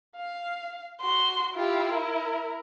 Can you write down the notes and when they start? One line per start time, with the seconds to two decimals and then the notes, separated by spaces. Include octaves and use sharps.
0.16 F5
1.01 F#4 C6
1.56 E4 F4 G4
1.91 A#4